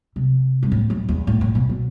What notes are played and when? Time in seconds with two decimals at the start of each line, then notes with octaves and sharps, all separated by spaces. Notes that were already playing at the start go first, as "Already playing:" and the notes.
0.16 C3
0.63 G2
0.72 A2
0.90 F#2
1.09 E2
1.27 A2
1.41 A2
1.55 B2
1.69 B2